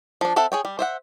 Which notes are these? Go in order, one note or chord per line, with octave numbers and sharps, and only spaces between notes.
F3 D4
C4 A4 E5 F#5
G#4 C#5 G5
G3
C5 E5 F#5